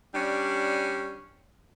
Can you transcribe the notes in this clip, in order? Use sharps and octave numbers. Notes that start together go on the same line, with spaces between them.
G3 C#4 D4